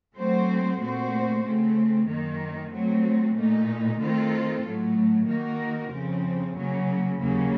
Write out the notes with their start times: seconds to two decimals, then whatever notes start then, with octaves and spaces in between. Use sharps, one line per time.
0.17 F#3 A3 C4 F#4 C5
0.81 A#2 A3 C4 F#4 C5
1.44 C#3 A3 C4
2.09 F#2 D#3 A#3
2.72 F#3 A3 C4
3.36 A#2 A3 D#4
4.00 D#3 A3 C4 F4 A4
4.63 A2 F#3 A3
5.27 D#3 A#3 D#4 F#4 A#4
5.91 F2 C#3 F3 C4
6.55 C#3 F#3 A#3
7.19 D#2 C#3 F#3 A#3